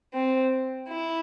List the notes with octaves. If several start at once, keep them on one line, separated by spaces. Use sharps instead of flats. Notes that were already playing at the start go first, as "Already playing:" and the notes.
C4
E4